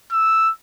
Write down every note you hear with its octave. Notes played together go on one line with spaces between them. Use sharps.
E6